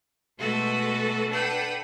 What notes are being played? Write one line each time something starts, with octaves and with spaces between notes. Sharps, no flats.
B2 G#3 A3 F#4 A4 B4
D4 A4 B4 F#5 G5